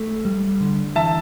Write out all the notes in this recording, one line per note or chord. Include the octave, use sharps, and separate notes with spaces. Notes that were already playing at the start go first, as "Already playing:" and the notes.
Already playing: A3
G3
D3
E3 E5 A5